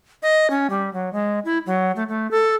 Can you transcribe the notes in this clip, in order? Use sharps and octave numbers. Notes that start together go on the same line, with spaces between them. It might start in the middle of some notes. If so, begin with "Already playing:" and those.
D#5
C#4
G3
F#3
G#3
E4
F#3
A3
A3
A4